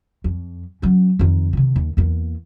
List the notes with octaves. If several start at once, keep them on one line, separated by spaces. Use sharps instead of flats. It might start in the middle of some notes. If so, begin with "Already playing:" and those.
F2
F#3 C#4
F2 D#3
C3 D#3
D#2
E2 A#3